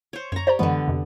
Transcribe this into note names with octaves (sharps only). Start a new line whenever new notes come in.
C5 C#5
F#2 C#5 A#5
G4 C5 D5 A#5
F#2 D3 E3 G#3 B3
F2 C3